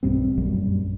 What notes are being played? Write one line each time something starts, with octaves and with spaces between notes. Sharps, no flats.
B1 G2 G3 C4
A#1 F#2 F#3 G3